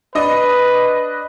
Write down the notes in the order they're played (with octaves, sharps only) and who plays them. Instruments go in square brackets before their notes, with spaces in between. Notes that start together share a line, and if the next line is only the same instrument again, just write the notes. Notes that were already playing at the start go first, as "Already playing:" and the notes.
[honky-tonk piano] D4 D#5 [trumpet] B4